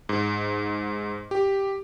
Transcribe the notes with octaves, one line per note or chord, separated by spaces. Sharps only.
G#2
G4